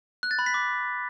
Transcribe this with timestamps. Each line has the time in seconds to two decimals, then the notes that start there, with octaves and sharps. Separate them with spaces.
0.23 F#6
0.31 A6
0.39 B5
0.46 B6
0.54 D6